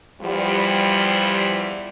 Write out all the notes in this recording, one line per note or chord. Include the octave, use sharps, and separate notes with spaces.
E2 F3 G3